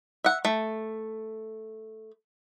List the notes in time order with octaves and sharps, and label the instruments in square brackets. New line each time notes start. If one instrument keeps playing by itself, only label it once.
[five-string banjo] E5 F#5
A3